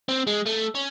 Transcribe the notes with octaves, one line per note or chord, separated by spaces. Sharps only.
C4
G#3
A3
C#4